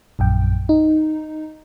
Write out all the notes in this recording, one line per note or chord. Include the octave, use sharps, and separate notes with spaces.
A#1 F#2 G5
D#4